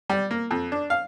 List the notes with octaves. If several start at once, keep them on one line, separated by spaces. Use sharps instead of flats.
G3
A#3
F2
D4
F5